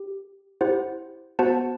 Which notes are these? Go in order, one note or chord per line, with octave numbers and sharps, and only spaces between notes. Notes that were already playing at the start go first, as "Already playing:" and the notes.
Already playing: G4
E4 G4 C5 F#5
B3 F#4 C5 F#5 A5